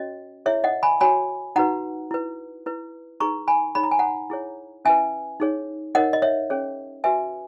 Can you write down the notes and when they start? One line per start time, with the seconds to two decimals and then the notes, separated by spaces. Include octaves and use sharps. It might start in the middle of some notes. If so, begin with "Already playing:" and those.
Already playing: C#4 F#4 C#5 D#5
0.46 E4 G#4 C#5 E5
0.64 D#5 F#5
0.83 G#5 B5
1.01 F#4 C#5 G#5 B5
1.56 D#4 F#4 B4 F#5 A#5
2.11 E4 B4
2.66 E4 B4
3.20 D#4 G#4 B4 A#5 C#6
3.48 G#5 B5
3.75 D#4 G#4 C#5 B5
3.84 A#5
3.91 G#5
3.99 F#5 A#5
4.30 E4 G#4 C#5
4.85 C#4 E4 B4 E5 G#5
5.40 D#4 G#4 C#5
5.95 D#4 A#4 C#5 D#5 F#5
6.13 D#5
6.22 C#5 E5
6.50 C#4 G#4 C#5
7.04 F#4 B4 E5 G#5